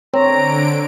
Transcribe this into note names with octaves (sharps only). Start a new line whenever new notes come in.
D3 C4 C#5 A#5 D7